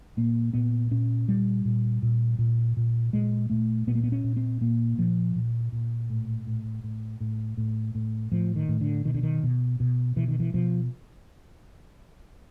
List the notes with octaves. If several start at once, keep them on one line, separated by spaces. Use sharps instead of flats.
A#2 A#3
A#2 B3
A#2 C#4
A#2 G3
A#2
A#2
A#2
A#2
A#2 G#3
A#2 A3
A#2 B3
A#3
B3
C#4
A#2
C4
A#2 A#3
A#2 F3
A#2
A#2
A2
A2
A2
A2
A2
A2
A2 F3
D#3
A2
D3
B2 D#3
D3
D#3
B2
B2
B2 E3
D#3
E3
B2 F3